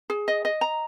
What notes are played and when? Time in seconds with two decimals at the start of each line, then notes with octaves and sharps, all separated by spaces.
0.10 G#4
0.28 D#5
0.45 D#5
0.61 A#5